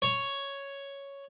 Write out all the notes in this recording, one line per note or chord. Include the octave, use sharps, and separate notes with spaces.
C#5